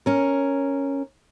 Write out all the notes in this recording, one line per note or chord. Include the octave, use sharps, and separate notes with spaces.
C#4 A#4